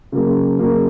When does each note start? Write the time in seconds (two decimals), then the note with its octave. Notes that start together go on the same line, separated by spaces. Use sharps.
0.12 C#3 F#3 A#3
0.59 C#3 F#3 A#3